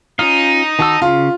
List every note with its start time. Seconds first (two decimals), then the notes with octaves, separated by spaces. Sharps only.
0.19 C#4 D#4 F4 F5
0.79 D#3 F#4 A5 E6
1.02 C#3 F4